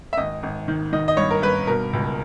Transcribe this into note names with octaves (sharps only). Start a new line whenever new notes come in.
E5
G#1 D#5
G#1
D#3
D#3 D#5
D#5
G2 C#5
A#4
G2 B4
B2 A#4
C#2